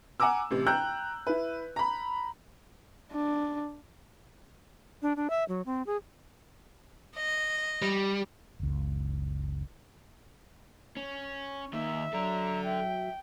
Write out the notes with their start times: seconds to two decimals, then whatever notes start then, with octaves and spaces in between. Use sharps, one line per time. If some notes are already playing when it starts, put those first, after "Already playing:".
0.20 F#5 G#5 A#5 D6 E6
0.51 A1 C3
0.67 G5 A#5 E6 F#6 G6
1.27 E4 B4
1.76 A#5 B5
3.12 D4
5.02 D4
5.17 D4
5.30 E5
5.48 F#3
5.66 C4
5.87 G#4
7.16 D#5
7.82 G3
8.60 F#1 C#2
10.97 C#4
11.73 D#3 A#3 E5
12.13 F#3 A4 D5 A#5
12.65 E5 G5